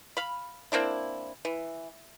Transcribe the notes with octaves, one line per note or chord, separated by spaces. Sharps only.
F5 B5
A#3 C4 D4 E4
E3